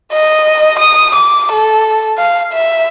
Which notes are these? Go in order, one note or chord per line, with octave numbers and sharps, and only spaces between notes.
D#5
D#6
D6
A4
F5
E5